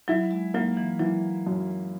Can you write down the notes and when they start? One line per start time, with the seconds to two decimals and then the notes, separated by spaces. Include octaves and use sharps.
0.08 F#3 E4
0.31 G#3
0.54 F#3 A#3
0.77 E3
1.00 E3 F#3
1.47 F#2